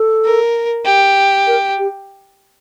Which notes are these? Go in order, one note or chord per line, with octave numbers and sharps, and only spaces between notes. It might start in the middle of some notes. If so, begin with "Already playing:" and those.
Already playing: A4
A#4
G4
A#4
G4